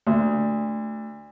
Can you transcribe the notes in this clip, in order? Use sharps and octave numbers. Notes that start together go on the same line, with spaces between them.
D2